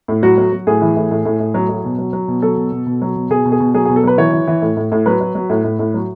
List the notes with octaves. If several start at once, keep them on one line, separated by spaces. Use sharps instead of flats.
A2
F#3 F#4
F#3
F#3
A2 G#4
E3
A2
A2
A2
A2
F#3
F#3
B2
F#3
F#3
B2
F#3 A4
B2
B2
B2
F#3
B2
B2 G#4
B2
G#4
B2
F#3 G#4
G#4
B2
A4
F#3 B4
E3 C#5
E3
E3
A2
A2
A2
F#3 B4
F#3
F#3
A2
A2
A2
F#3